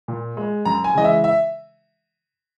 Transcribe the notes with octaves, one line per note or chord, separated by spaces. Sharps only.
A#2
G#3
F#2 A#5
G#5
C#3 E3 G#3 D#5
E5
E5